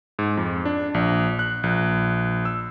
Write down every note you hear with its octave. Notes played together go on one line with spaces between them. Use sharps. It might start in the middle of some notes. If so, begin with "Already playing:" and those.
G#2
F2
D4
A#1
F#6
A#1
E6